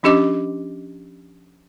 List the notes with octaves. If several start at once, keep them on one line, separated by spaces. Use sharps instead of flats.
F3 C#4 D4 G4 D#5 D6